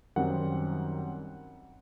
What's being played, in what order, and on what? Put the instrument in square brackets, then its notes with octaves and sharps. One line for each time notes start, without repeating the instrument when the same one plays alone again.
[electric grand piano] F#2 D#3 G3 C4 F#5